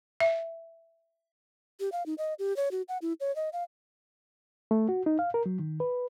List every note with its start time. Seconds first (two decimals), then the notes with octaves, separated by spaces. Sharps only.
0.20 E5
1.79 G4
1.92 F5
2.06 D#4
2.18 D#5
2.39 G4
2.56 C#5
2.71 F#4
2.89 F#5
3.02 E4
3.20 C#5
3.36 D#5
3.53 F5
4.71 A3
4.89 F#4
5.06 D#4
5.19 F5
5.34 A#4
5.46 F#3
5.59 D#3
5.80 B4